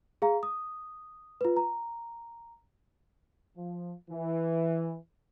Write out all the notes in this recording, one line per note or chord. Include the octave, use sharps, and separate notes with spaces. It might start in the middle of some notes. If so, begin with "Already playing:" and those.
G#4 F5 A#5
D#6
F4 B4
A#5
F3
E3